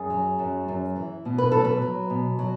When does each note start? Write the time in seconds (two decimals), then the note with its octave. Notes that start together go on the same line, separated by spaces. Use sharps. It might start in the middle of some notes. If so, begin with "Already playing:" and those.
Already playing: F#2 G#4
0.10 F#3
0.39 F#2
0.68 F#2
0.96 E3
1.25 B2
1.38 B4
1.52 F#3 A4
1.65 B4
1.82 F#3
2.10 B2
2.39 F#3